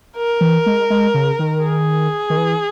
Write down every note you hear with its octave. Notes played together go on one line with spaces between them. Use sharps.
A#4
E3
G#3
G#3
C#3
D#3
G#4
D#3
E3